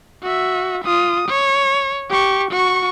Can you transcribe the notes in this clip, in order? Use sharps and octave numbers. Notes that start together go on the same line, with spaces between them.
F#4 E5
F4 D#6
C#5
G4 C#6
F#4 C#6